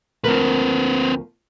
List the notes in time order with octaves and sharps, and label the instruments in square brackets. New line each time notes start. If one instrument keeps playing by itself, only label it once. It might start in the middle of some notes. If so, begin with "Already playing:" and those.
[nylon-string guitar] D2 F3 A#4 [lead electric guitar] C4 B4